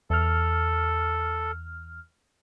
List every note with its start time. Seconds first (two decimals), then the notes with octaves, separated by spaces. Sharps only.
0.10 E2 A4 F6